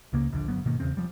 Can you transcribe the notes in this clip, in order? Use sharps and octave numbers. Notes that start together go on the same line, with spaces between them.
C#2 C#3 A#3
D#1 A#1 D3
G1 F#3 B3
G#2 B2 D#3 A#3
D#1 E2 C#3 C4
F3 G3